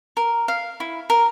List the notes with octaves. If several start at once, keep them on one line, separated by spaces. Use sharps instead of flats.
A#4
F5
E4
A#4